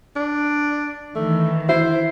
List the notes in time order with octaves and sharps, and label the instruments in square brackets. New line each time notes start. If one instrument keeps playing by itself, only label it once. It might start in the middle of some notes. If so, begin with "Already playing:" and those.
[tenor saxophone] D4
[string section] D#3 E3 [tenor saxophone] A3
[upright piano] E4 [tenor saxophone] C5